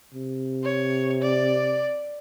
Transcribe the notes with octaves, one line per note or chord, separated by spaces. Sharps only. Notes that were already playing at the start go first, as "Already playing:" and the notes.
C3
C#5
D5